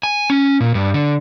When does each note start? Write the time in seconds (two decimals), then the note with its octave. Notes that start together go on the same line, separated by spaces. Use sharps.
0.03 G#5
0.30 C#4
0.61 A#2
0.75 G2
0.94 D3